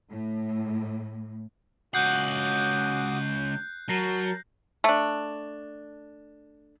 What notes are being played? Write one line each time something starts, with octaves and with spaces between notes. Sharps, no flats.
A2
C#2 F#4 F#5 D6 D#6 F#6 G6 C7
F#3 A#4 A5 A#6 C7
A3 D4